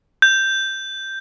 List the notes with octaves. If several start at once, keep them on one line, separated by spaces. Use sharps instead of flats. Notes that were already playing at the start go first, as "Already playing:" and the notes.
G6